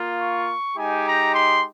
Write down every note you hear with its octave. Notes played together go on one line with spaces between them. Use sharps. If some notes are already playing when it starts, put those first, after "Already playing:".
Already playing: A#3 F4
C#6
G#3 D#4 G4 G#5
A#5
C6